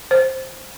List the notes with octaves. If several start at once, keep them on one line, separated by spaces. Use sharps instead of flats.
C5